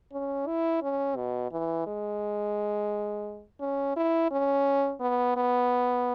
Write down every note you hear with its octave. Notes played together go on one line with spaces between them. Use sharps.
C#4
E4
C#4
B2
E3
G#3
C#4
E4
C#4
B3
B3